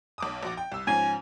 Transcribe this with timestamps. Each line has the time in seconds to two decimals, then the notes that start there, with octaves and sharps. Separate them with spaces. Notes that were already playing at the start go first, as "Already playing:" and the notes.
0.18 B1 D6 D#6
0.43 A#1 F#4 D6
0.57 G5
0.72 C2 E6
0.87 G#2 F3 C#4 G#5